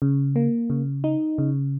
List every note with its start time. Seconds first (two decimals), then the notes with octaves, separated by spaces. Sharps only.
0.02 C#3
0.36 A#3
0.70 C#3
1.04 D#4
1.38 C#3